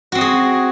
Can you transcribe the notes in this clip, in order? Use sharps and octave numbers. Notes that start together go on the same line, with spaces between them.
C4 F#4 G#4 D#5